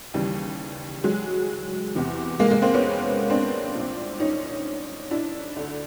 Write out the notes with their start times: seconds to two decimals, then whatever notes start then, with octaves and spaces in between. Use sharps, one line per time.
0.14 D#2 C#3 E3 G3
1.04 F#3 G#3
1.95 E2 C3 E3
2.39 G#3 A#3
2.51 G#3 A#3
2.62 A#3 C4
2.74 B3 C#4
3.30 C4 D4
3.75 C2 A#2
4.20 C#4 D#4
5.11 D4 E4
5.56 D2 D3